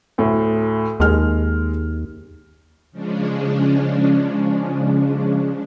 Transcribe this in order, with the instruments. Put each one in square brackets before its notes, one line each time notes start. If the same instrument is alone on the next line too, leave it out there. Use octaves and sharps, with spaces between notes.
[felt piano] D2 A2
[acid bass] D#2 [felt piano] G#3 F6
[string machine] C#3 F3 G#3 C#4 D4